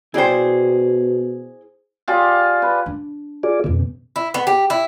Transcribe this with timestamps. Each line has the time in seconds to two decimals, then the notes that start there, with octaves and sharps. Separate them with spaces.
0.14 B2 E4 G#4 C5 D5 G5
2.08 F4 G4 G#4 D5
2.62 B4
2.86 D4
3.43 F4 G#4 D5
3.64 F2 B2 C#4
4.16 E4
4.34 B3
4.47 G4
4.70 E4